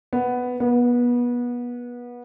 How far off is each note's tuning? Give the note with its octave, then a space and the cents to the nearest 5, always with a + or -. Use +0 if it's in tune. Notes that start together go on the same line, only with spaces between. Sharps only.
B3 +5
B3 -25